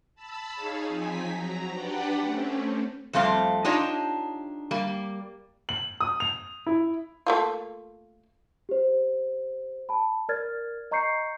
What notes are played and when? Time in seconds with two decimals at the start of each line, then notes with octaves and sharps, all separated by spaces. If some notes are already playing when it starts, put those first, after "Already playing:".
0.15 A5 B5 E6
0.55 D#4 G#4 C#5 F5
0.88 F3 C4 D#4 G#5 B6
1.27 F#3 A#5
1.71 D4 G4 B4 D5 F#5 G5
2.21 A3 C4 C#4
3.13 F2 G3 A3 C4 F5
3.65 D4 D#4 F4 G4 C#5 D#5
4.71 G3 A#3
5.69 F#7
6.00 D#6
6.20 F7
6.66 E4
7.26 A3 A#3 F4
8.69 G4 C5
9.89 A5 B5
10.29 A#4 D5 F6 G#6 A6
10.91 D#5 A#5 C#6 G6 C7 C#7